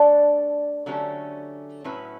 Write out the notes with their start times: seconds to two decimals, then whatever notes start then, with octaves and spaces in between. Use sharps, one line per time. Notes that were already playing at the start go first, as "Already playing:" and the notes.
Already playing: A3 D4 A4 D5
0.86 D3 F#3 A3 C#4 G4
1.84 A2 F#3 C#4 E4 B4